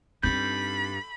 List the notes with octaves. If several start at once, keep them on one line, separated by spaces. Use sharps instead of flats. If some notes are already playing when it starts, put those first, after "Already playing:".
G2 C4 D#4 A4 B5 G6